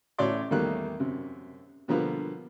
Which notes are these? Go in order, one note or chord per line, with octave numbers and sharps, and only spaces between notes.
A1 A2 C#5 D5 C6 D6
E2 D#3 G3 A3 A#3 F#6
F#2 C3
B2 D3 F3 G3 A#3 B3